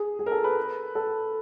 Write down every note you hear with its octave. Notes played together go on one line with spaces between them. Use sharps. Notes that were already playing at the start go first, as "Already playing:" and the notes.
Already playing: G#4
G#4
A#4
A4
B4
A4